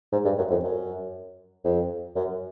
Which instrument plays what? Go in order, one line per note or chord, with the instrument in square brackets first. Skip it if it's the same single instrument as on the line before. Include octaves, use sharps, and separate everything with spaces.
[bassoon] G#2
G2
F#2
F2
F#2
F2
F#2